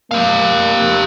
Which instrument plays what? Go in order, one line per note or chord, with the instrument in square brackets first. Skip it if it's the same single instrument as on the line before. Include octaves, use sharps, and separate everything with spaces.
[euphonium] A#3 [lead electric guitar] G4 F5